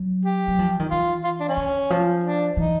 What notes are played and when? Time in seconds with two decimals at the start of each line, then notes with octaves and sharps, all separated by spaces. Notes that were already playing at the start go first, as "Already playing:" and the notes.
Already playing: F#3
0.25 G4
0.48 F#3
0.59 F3
0.79 D#3
0.91 E3 F4
1.24 F4
1.40 D4
1.49 C#4
1.57 D#3
1.90 F3
2.24 D4
2.57 E3 D#4